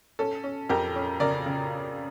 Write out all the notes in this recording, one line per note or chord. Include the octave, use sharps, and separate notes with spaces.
C#4 A4
C#4
F2 G4 A#4
C#4
C#3 A#4 D5
C#3